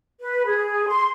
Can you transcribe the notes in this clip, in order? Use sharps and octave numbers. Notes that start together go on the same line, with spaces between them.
B4
G#4
C6